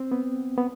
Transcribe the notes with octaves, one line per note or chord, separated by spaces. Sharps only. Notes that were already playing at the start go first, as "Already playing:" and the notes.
Already playing: C4
B3
B3